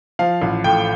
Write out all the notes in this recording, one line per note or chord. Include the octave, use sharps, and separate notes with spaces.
F3 F5
A1
A2 G5